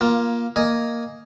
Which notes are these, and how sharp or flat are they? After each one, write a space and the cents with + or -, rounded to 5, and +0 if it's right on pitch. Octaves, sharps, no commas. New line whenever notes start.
A#3 +15 F4 +0
A#3 +0 D#5 +0 G#5 +0